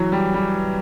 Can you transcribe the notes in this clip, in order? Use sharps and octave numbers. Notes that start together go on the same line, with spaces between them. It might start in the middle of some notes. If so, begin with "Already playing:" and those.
Already playing: E3 F#3
G3
G3